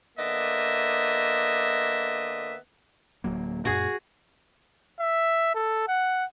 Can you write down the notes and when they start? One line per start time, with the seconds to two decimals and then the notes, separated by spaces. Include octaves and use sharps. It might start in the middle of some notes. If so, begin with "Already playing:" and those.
0.18 D3 A#3 B3 D#5 E5
3.24 D1 F#3 A#3
3.65 F#2 A#2 F#4 G#4
5.00 E5
5.54 A4
5.88 F#5